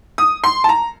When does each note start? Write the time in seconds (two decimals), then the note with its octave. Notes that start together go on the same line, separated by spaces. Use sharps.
0.18 D#6
0.44 C6
0.64 A5
0.69 A#5